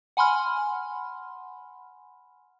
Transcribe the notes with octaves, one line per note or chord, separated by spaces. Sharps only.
F#5 G#5 B5 C6 F6